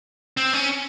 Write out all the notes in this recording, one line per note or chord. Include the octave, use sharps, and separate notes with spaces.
C4
C#4